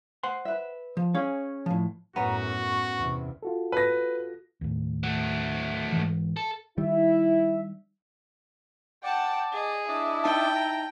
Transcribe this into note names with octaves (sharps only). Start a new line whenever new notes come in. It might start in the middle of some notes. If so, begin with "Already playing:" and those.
C5 F#5 C6
B4 E5
F3
C#4 G#4 C#5 F5
A2 F3
F#2 A2 B3 C#4 F#4 A#5
C#6
E2 C3
F4 F#4 A4
B4 A#6
D#2 A2
F#3 A3
G#2 E3
A4
D#3 G3 E4 E5
D5 F#5 G5 A5
G#4 D#5
D4 E4 D5 D#5
D#4 G5 A5
A#5